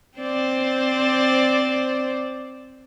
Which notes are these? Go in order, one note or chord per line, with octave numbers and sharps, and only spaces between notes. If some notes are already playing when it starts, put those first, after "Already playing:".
C4 C5 D5